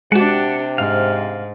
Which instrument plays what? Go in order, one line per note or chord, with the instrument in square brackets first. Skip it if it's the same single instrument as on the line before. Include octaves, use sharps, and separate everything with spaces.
[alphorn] C3 [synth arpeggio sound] G#3 F#4 [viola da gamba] D4 G4 [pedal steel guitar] F#5 A5
[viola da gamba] G#2 [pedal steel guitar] F5 F6